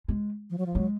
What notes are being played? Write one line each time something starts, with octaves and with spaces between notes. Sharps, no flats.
G#3
F3
F#3
F3
F#3 G#3